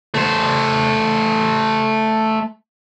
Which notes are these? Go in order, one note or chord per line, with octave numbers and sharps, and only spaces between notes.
A3 C5